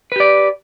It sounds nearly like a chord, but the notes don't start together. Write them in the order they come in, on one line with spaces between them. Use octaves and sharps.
B4 G4 D5